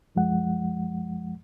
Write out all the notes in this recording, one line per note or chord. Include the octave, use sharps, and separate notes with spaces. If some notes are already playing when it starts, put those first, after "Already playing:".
C2 F#2 F3 G#3 F#5